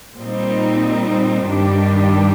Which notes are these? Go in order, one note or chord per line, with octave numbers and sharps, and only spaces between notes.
A#2 G3 C4 D#4
G2 D#3 G3 D4 G4